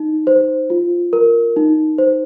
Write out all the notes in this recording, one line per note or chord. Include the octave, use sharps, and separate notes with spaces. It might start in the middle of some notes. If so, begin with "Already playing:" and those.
Already playing: D#4
C5
F4
A#4
D#4
C5